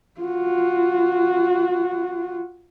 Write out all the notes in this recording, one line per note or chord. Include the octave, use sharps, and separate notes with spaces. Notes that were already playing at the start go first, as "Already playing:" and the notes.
F4 F#4